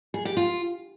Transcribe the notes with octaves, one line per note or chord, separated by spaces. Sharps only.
G#4
G4
F4